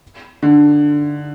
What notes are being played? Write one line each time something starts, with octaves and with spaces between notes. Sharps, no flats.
D3